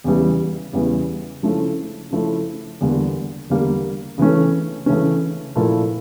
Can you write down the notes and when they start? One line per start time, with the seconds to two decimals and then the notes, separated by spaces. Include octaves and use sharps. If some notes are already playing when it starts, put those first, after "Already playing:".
0.04 E2 C#3 E3 G3
0.73 E2 C#3 E3 G3
1.43 C#3 F3 A3 C#4 E4
2.11 C#3 F3 A3 C#4 E4
2.81 E2 D3 G3 A#3
3.50 E2 D3 G3 A#3
4.18 C#3 E3 A3 C#4
4.86 C#3 E3 A3 C#4
5.55 A#2 F3 A3 E4 A#4